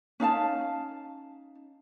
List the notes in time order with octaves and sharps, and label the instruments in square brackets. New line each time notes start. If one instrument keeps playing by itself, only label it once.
[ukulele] C#4 D#4 F5 A5